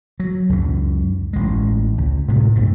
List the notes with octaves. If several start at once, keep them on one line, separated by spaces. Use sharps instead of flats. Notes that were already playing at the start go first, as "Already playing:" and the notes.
F#3
C#2 F#2
A1 G#3
C#2
A2 C3 G#3 A3
C2 G2 A3